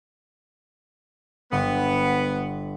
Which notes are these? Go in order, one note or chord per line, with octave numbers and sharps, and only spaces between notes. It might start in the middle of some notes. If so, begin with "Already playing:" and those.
G1 B3 F#5